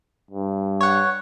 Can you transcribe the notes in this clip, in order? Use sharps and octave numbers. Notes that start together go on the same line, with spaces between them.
G2
C#5 F#5